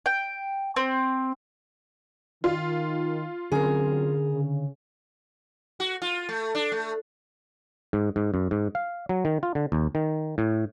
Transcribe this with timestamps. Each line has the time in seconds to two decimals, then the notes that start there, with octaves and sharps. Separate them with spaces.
0.06 G5
0.76 C4
2.44 D#3 F4
3.52 D3 F#3 C4 C#4 G#4 A#4
4.31 C#3
5.80 F#4
6.02 F4
6.29 A3
6.55 D4
6.72 A3
7.93 G#2
8.16 G#2
8.34 F#2
8.51 G#2
8.75 F5
9.09 F#3
9.25 D#3
9.43 F4
9.55 D3
9.72 D#2
9.95 D#3
10.38 A2